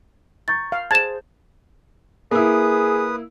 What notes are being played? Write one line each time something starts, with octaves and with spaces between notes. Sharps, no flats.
A#5 C#6 G6 A6
F5
G#4 C5 A5 G#6 E7
A#3 E4 G#4 B4 D#6